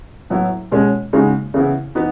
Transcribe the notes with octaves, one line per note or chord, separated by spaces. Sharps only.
A2 F#3 B3 E4
B2 G#3 C#4
C#3 G#3 D#4 F#4
C#3 E3 B3 E4
E3 B3 D#4 F#4